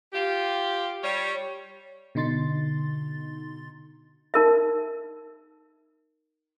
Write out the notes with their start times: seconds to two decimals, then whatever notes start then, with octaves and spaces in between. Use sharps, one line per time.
0.13 F4 G4
1.03 G3 C#5
2.15 B2 D3 D#4 C6 A6
4.34 D#4 A#4 E5